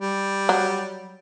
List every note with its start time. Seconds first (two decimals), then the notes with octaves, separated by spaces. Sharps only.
0.01 G3
0.49 F#3